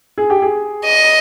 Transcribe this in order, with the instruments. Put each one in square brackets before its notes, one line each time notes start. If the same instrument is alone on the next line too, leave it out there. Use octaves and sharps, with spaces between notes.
[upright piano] G#4
G4
G#4
[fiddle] D#5